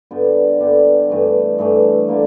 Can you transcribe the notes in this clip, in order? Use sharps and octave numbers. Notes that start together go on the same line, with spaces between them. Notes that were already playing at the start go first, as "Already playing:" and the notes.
G2 D3 G3 B3
G2 D3 G3 B3
G2 E3 A3
G2 E3 A3
D3 G3 A#3